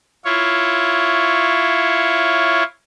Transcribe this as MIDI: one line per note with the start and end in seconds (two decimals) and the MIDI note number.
0.25 2.63 64
0.25 2.63 65
0.25 2.63 73